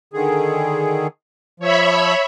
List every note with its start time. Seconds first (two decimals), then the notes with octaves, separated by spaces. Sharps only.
0.14 D3 D#3 G#4
1.60 F3 C#5 E5 B5